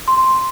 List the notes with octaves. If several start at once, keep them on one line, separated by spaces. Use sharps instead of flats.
C6